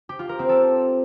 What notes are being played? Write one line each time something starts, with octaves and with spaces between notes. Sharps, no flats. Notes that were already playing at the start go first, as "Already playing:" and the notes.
G4
F4
A#4
C4
A4